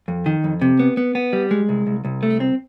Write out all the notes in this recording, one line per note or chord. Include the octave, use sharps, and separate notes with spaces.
F2
D#3
F2
C3
B3
B3
B3
G3
G#3
C2
C2
C2
A3
C4